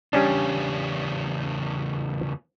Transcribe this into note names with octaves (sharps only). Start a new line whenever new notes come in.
E2 C#3 G3 C#4 D4